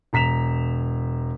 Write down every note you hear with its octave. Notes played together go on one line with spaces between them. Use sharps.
E1 A#5 B6 E7 F7